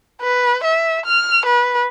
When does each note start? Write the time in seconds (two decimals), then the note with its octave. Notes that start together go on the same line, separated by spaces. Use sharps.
0.21 B4
0.63 E5
1.06 F6
1.46 B4